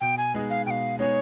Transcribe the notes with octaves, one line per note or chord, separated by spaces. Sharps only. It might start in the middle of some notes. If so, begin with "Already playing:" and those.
B2 G5
G#5
G#3 B3 D#4 G#4
F5
B2 F5 G5
G#3 B3 D#4 G#4 C#5